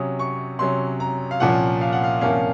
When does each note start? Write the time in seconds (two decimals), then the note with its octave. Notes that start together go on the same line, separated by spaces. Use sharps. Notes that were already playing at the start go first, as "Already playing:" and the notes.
Already playing: C3 F#3 C#4 D#6
0.19 C#6
0.59 C3 F#3 C#4 C6
1.00 A#5
1.31 F5
1.40 C2 A#2 F3 A#3 C#4 F#5
1.81 F5
1.92 F#5
2.04 F5
2.21 C2 A#2 F3 A#3 C#4 F5